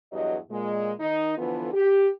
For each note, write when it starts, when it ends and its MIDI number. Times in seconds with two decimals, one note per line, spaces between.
0.12 0.35 40
0.12 0.35 43
0.12 0.35 54
0.12 0.35 75
0.50 0.91 46
0.50 0.91 56
0.99 1.32 51
0.99 1.32 63
1.37 1.69 50
1.37 1.69 52
1.37 1.69 53
1.37 1.69 59
1.37 1.69 65
1.37 1.69 69
1.73 2.08 67